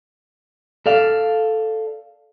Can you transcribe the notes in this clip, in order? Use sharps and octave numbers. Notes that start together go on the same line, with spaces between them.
A4 D5 F5